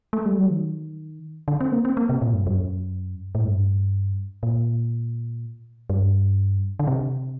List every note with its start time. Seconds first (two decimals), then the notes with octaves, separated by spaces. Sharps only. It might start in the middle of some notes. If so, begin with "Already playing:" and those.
0.13 A3
0.26 G3
0.38 F#3
0.51 D#3
1.48 D3
1.61 C4
1.72 A#3
1.85 C4
1.97 A#3
2.09 C3
2.22 A#2
2.33 G2
2.47 F#2
3.35 A2
3.44 G2
4.43 A#2
5.90 G2
6.79 D3
6.87 C3